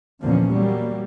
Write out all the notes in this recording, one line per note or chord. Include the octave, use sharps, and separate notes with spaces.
E2 A#2 D3 F3 A#3 C#4
F#3 G3 A#3